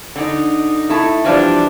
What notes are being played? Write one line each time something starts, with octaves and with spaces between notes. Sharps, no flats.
D3 D#4
A3 E4 A5
E3 F3 G3 D4